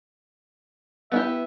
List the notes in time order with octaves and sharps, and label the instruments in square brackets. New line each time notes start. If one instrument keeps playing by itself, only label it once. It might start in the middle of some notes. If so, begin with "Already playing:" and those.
[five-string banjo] B3 E4 G4 [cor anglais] E5